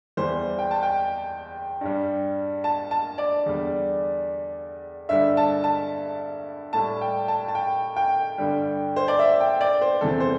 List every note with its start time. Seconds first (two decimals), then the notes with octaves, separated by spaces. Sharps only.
0.17 E2 E3 G3 C5
0.59 G5
0.71 A5
0.83 G5
1.81 G2 G3
2.64 A5
2.91 A5
3.18 D5
3.46 E2 D3 G3
5.09 G2 D3 G3 E5
5.37 A5
5.64 A5
6.73 A2 G3 A5
7.01 G5
7.28 A5
7.48 A5
7.55 G5
7.96 G5
8.38 G2 D3 G3
8.96 C5
9.08 D5
9.19 E5
9.40 G5
9.61 D5
9.81 C5
10.01 E2 C3 E3 G3 A4
10.20 C5